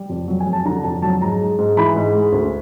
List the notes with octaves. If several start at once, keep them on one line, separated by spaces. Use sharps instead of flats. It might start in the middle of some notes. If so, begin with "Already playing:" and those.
Already playing: G3
F2
F#3
G#5
F2
A5
D3 A#5
F2 A5
F#3 A5
G#2 A#5
G#3
G#2
E3 B5
G#2
G#3
D2